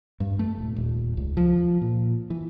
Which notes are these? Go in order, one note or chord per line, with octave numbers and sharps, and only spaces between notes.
G2
A3
D#1
D#1
C#2
F3
A#2
E3